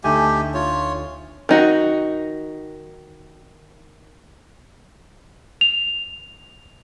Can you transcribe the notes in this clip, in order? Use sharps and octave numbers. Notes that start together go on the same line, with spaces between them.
D2 A3 D#4 G4 G#5
F4 C#5
D#3 D#4 F#4
F7